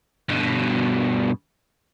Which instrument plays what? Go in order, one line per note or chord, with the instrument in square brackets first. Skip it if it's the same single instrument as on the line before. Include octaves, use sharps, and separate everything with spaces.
[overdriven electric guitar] G2 B2